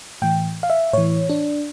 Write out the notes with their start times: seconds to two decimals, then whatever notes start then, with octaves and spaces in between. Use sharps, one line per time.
0.22 A2 E3 G5
0.63 F5
0.70 E5
0.93 A2 E3 C#5
1.29 D4